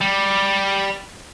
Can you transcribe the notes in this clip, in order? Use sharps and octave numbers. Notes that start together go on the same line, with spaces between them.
G3